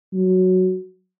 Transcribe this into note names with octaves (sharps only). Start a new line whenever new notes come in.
F#3